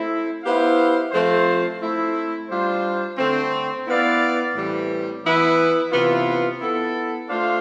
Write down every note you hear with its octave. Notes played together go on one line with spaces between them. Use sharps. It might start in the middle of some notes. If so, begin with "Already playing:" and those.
Already playing: A3 C4 E4 A4
B3 E4 G4 C5 F5
F3 A3 C4 F4 C5
A3 C4 E4
G3 D4 F4 C5
D3 A3 C4
B3 E4 B4 D5 F5
A2 E3 G3 C4
E3 B3 E4 B4
C3 E3 B3 F4
B3 E4 A4
A3 D4 F4 C5 F5